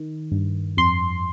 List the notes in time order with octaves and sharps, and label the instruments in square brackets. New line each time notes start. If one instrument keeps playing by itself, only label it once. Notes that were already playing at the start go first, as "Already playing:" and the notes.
Already playing: [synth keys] D#3
G2
F2 C6